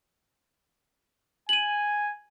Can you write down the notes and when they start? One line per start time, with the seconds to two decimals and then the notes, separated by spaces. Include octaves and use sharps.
1.49 G#5 D#7 F#7